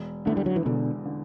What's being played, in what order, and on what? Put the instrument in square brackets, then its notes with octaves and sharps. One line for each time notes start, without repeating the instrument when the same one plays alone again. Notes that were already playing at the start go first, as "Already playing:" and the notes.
Already playing: [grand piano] E1
[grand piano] E2 D3 [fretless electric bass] A3
[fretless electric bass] G3
F#3
E3
[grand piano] E1 [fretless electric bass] B2 D3
[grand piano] D3